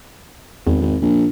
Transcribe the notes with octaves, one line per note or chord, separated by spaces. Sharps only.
G#1 E2
G#1
A#1